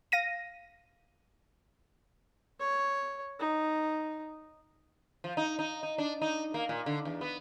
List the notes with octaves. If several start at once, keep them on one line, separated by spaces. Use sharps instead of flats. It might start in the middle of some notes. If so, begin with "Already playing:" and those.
F5 A#6 D#7
C#5
D#4
F3
D#4
D#4
D#4
D4
D#4
A#3
A#2
D3
E2
B3